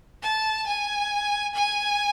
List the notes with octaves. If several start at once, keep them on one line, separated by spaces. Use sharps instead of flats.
A5
G#5
G#5